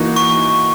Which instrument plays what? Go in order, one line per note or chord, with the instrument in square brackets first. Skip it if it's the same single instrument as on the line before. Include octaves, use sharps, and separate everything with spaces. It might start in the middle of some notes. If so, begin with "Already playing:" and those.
Already playing: [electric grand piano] E3 A#3 D#4 F#4
[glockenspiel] C#6